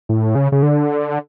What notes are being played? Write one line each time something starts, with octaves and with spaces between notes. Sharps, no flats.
A2
C#3
C#3
D3